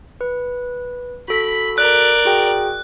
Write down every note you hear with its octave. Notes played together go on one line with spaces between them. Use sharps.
B4
F#4 A4 B5 B6
A#4 D5 F#6
F#4 G#4 G5